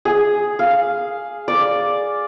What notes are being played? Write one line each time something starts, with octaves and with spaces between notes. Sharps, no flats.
G#4
F5
D5